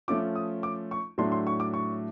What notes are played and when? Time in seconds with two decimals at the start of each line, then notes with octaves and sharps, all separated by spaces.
0.08 F3 A3 C#4 F4 D6
0.35 D#6
0.63 D6
0.91 C#6
1.18 A2 F#3 A3 D4 C6
1.32 C6
1.47 C#6
1.60 D6
1.74 C#6